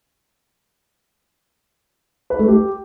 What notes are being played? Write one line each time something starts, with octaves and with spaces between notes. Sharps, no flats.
B4
A3
G4